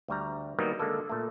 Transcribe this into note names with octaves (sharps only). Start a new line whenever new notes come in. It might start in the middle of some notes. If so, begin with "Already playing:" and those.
D2 G3 A#5
D#3 F#3 G3 A#3 B3 D#4
D3 G#3 A#3 A4
A#2 A3